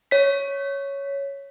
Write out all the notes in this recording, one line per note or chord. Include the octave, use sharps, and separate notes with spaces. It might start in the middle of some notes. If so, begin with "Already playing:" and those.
C#5 B6